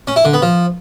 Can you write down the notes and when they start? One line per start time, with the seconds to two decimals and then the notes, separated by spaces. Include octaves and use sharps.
0.07 C#4
0.16 E4
0.25 D3
0.34 B3
0.42 F3